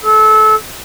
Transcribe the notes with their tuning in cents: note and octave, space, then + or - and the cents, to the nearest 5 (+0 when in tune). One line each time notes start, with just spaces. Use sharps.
A4 -25